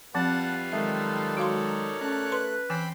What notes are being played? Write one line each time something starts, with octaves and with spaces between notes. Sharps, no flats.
F3 G3 C4 F4 B4 F#5 A5
D#3 F#3 G#3 D#4 A4 E5
F#4 A#4 C#5 D5 F5 C6
A3 C#4 F#6
B4 C6
E3 C4 G5 G#5 B5 C6